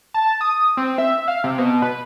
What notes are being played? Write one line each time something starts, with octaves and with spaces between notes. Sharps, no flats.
A5
D#6
C4
E5
F5
C3
B2
B4